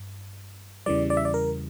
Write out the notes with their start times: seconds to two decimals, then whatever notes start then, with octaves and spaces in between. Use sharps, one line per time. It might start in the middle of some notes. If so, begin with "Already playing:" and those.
Already playing: G2
0.86 E2 C#3 E3 G3 D5
1.10 D5
1.17 E5
1.25 D5
1.34 A#4